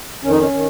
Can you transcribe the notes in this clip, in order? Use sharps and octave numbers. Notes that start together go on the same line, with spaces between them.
F2 D#3 C#4
D#4
C#4
D#3